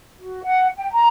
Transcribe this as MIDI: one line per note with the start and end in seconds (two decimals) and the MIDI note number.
0.18 0.42 66
0.44 0.68 78
0.77 0.90 79
0.92 1.08 82